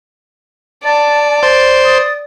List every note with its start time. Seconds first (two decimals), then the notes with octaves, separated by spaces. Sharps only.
0.84 D5 A5 A6
1.43 C5 A6
1.84 D#6